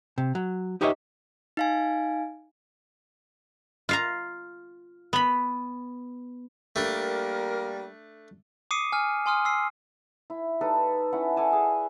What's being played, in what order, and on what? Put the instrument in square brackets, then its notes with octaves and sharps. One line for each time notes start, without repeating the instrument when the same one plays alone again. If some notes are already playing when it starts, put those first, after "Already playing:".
[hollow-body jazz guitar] C3
F#3
D#4 G4 B4 C#5 D#5 E5
[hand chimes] D#4 F5 G#5
[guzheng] F4 F5 A#5
B3 B5
[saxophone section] G3 A#3 A#4 [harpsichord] A3 D4
[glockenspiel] D6 D#6 C7 C#7 D#7
G#5 F6
G#5 C6 D#6 F6
E6 C7
[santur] E4
G3 D#4 A4 B4
C#4 E4 F#5
A4 D5 G#5 A5
G#4